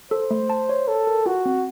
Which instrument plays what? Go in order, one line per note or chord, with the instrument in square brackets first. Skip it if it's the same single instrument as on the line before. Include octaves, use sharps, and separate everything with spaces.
[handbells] A4 [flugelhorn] C5
[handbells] A3
A5
C#5
[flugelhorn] A4 [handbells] C#5
[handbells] A#4
[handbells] F4 [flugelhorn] F#4
[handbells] C4